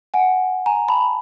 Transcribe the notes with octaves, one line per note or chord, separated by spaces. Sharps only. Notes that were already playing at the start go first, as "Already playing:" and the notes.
F#5 G#5
G#5 A#5
A5 B5